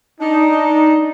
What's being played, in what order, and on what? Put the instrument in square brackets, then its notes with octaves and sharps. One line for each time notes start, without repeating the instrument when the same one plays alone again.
[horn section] D4 D#4